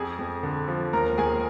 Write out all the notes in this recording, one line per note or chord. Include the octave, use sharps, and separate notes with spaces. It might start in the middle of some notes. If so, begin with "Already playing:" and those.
Already playing: F2 G#4 G#5
F2
D3
F3
D#2 A#4 A#5
D#2 G#4 G#5